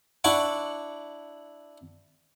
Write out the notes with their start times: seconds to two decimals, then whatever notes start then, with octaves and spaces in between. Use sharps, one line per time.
0.24 D4 E4 F#5 C#6 D6